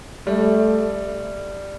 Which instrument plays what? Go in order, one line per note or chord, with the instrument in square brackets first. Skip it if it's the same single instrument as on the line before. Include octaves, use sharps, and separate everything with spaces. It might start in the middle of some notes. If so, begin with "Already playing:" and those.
[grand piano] G3 [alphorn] A3